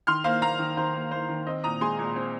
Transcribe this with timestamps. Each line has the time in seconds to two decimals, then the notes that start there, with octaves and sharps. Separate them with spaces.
0.07 D#3 C6 F6
0.24 A#3 C5 F5
0.42 A#3 F5 A#5
0.59 D#3
0.77 D#3 C5
0.94 A#3
1.11 A#3 C5
1.29 D#3
1.47 C4 D#5
1.64 A#2 A#5 D#6
1.81 G#3 G#5 C6
1.99 A#2
2.16 C4